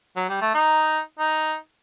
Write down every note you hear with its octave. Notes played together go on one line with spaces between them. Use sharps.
F#3
G3
A3
D#4
D#4